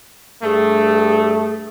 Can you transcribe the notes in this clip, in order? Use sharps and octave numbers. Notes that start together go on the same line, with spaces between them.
G2 A3 G#4